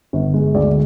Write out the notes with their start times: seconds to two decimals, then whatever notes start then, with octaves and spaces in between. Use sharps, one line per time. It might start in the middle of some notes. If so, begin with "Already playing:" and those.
0.13 G1
0.34 G#3
0.55 D2 D5